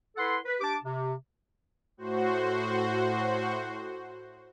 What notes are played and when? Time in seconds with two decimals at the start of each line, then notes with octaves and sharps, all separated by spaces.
0.17 E4 A4 B4 F#5 C6
0.45 B4
0.61 D4 G4 A5 D6
0.83 C3
1.97 A2 F#4 C5